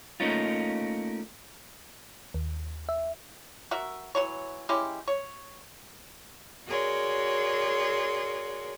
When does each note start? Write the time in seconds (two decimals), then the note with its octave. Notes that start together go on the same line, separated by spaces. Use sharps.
0.20 A3 A#3 C#4 D#4 F4
2.34 D#2
2.89 E5
3.71 F#4 A#4 E5
4.15 E3 F#3 C#5
4.69 G#3 C#4 E4 G4
5.08 C#5
6.66 F#4 G#4 A#4 C#5 D5 C6